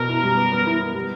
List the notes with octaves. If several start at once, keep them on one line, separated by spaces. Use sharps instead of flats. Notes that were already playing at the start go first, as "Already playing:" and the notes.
Already playing: B2 B3 A#4
E4
G3
B3
B3
E4
B3
G3